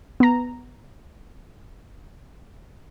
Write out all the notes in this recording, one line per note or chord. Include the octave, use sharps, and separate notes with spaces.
B3 A#5